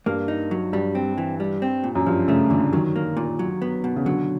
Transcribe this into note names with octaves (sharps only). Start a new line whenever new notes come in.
G2 A#3
D#4
F#3
G2 G3
C4
E3
G3
C4
A#2
F#2
G2 F3
C#3 A3
A#2 D3
D#3 F#3
A#3
A#2
F#3
B3
B2
C#3
D3 F#3